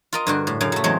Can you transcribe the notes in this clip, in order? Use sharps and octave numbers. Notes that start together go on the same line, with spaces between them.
F4 A#4 D#5
G2 D3 F#4
A2
F#2 C#3 F5
F#3 A3
E2 F#3 G#3 C4 C#5